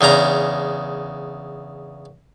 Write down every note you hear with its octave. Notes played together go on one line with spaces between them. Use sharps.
E2 C#3 D4 A#5